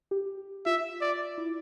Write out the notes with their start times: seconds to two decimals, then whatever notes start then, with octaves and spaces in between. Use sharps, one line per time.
0.11 G4
0.66 F4 E5
1.01 D5
1.38 E4